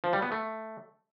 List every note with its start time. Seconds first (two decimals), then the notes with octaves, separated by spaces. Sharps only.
0.04 F3
0.13 G3
0.22 B3
0.32 A3